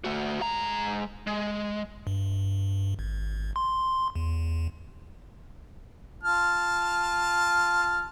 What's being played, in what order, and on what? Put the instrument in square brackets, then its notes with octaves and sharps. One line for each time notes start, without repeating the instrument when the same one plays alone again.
[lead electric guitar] A3 F#4
G#3 A#5
G#3
[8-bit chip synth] G2
G#1
C6
E2
[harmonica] F4 A5 F6